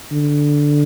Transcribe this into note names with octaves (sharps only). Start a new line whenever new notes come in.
D3